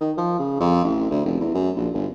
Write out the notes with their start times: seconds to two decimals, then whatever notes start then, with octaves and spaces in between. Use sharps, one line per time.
0.01 D#3
0.17 F3
0.39 C#3
0.60 F2
0.84 A1
1.10 D2
1.25 F1
1.41 E2
1.54 F#2
1.77 A#1
1.94 G1